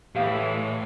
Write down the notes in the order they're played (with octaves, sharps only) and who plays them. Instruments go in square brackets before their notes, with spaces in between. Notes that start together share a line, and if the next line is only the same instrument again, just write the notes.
[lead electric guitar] A2 [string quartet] E3 G#3 [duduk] A3 [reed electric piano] G4 F5